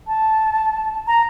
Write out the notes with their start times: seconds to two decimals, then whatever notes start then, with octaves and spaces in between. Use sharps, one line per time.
0.07 A5
1.07 A#5